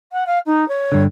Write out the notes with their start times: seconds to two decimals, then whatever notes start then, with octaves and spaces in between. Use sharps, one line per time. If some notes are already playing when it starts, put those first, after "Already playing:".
0.12 F#5
0.26 F5
0.46 D#4
0.68 C#5
0.92 G2 D3